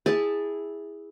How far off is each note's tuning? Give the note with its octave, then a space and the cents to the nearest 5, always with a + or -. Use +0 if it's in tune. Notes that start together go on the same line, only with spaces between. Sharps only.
E4 -10 G#4 -15 A5 +0